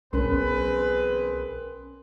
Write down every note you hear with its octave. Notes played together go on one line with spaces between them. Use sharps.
B1 E3 C4 C#4 G#4 A#4 B4 C6